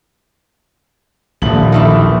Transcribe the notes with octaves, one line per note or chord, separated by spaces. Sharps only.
D#1 A#1 A3 F#7
D#3 E3 A3